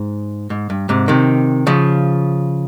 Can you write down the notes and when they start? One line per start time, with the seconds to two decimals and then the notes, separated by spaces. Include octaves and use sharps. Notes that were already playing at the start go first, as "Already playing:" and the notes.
Already playing: G#2
0.50 G#2
0.70 G2
0.89 G#2 C3
1.08 C3 D#3
1.67 C#3 F3